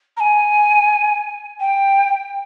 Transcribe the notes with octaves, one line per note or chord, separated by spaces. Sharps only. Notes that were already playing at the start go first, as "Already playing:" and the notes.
A#5
G#5
G5